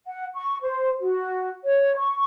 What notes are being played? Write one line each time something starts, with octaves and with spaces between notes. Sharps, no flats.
F#5
C#6
C5
F#4
C#5
C#6